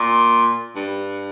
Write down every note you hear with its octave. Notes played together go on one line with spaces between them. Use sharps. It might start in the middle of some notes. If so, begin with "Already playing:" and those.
Already playing: A#2
G2